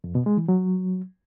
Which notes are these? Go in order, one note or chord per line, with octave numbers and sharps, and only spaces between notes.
F2
B2
G#3
E3
F#3